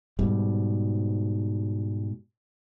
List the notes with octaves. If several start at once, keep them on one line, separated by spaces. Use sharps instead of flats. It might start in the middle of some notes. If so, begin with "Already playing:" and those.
G#2 B2 G3